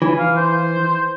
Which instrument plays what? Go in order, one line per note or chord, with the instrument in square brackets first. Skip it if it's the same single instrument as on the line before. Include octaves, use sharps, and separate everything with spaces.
[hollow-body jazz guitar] E3
[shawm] F5
C5